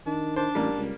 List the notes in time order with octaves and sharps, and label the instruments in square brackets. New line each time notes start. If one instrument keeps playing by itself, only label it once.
[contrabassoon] D#3 [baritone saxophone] D4
[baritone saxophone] D4 [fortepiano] C5
[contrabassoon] A1 [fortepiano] G3 A#3
[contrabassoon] C#2